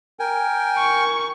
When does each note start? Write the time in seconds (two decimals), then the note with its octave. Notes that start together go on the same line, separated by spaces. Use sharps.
0.19 A#4 G5 G#5
0.78 C#6